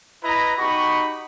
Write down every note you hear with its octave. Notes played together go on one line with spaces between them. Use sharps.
E4 B4 D#5 A#5
D#4 F#4 G4 D#5 B5 C#6